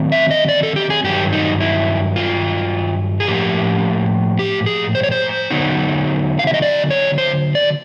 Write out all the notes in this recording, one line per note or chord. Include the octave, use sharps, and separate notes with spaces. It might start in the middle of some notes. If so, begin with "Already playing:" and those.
Already playing: D#3 F#3 A3 C4
E5
D#5
D5
A4
G4
G#4
G2 D#3 F#3 G4
D#4
E4
F4
G#4
A2 F3 A#3 G4
G4
G#4
C5
C#5
C5
D3 F#3 B3 D#4
F5
E5
D#5
D5
C#5
C5
D5